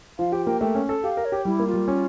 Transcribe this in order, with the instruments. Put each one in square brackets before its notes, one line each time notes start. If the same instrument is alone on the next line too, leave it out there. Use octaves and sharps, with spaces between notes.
[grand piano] F3 [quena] F5
[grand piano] G4 [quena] G5
[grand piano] A#3 [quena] G5
[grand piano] A3 [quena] G5
[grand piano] C#4
A4
[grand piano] G4 [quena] F5
[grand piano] A#4
[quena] C#5
[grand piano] G4
[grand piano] G3 [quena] E4
[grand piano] A#3
[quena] F4
[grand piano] G3
C#4